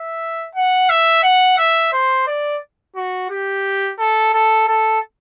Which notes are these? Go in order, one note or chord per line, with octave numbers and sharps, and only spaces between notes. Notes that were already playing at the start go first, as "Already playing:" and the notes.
Already playing: E5
F#5
E5
F#5
E5
C5
D5
F#4
G4
A4
A4
A4